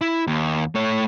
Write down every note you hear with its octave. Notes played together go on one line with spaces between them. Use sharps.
E4
D#2
A3 C#5